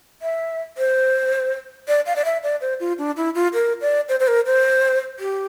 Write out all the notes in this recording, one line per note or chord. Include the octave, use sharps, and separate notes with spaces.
E5
C5
D5
F5
D5
E5
D5
C5
F4
D4
E4
F4
A#4
D5
C5
C5
A#4
C5
G4